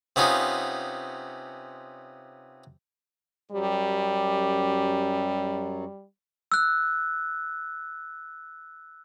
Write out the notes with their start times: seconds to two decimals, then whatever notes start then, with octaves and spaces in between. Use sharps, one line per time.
0.16 C3 B3 C#4 D#4 F4
3.51 F#2 F#3 G3 G4
6.52 E6 F#6